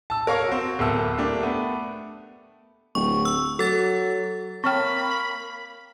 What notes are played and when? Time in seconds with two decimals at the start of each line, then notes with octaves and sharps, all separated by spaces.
0.10 A5 E6
0.27 A#4 C#5 F5 A#5 C#6
0.48 C4 F#4
0.79 D1 D2 A#3 B3 A4 E6
1.17 A3 A#3 D4 G4
1.43 A3 B3
2.95 D1 C#6
3.25 E6
3.59 F#3 A4 A6
4.64 A#3 C4 C#5 G5 B5 C#6 F6